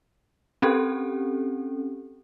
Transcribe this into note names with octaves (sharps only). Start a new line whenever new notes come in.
C4 C#4 G4 A4